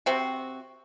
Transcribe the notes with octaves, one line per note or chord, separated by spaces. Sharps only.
C3 C4 F#4